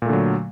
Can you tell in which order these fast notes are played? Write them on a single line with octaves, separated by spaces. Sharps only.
A#2 A3 D3 F#3